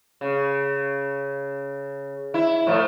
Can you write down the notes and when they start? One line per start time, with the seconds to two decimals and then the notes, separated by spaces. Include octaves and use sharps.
0.21 C#3
2.34 E4
2.67 A2 F3 A3